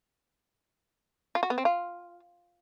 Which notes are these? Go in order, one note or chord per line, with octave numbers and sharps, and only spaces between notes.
F4
F#4
B3
C4
F4